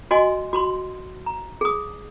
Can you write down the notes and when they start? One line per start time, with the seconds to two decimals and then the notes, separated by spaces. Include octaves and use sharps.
0.11 F#4 D#5 G#5 C6
0.53 F#4 B5 C6
1.26 A#5
1.61 G#4 D#6